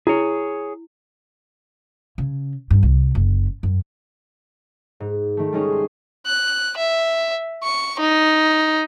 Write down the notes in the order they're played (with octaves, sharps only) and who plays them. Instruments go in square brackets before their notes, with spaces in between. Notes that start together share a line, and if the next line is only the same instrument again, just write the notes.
[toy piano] E4 [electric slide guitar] G#4 C#5
[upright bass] C#3
G2
C2
F#1
F#2
[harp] G#2
D#3 A3
G3 G#3 C#4 D#4 G#4
C6
[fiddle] F#6
E5
C#6
D#4